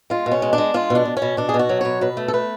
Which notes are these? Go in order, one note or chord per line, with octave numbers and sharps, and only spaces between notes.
G#3 F4
B2
C#4
G#3
D4
G#3
G#3 F4
B2
D4
B2
C#4
B2
B2 D4
G#4
B2
F#4
F#3
B2 C#5
B2 B4
A3
A4
A3 B4